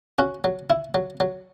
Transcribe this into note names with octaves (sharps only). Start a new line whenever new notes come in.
C#4 F#4
F#3
E4
F#3
F#3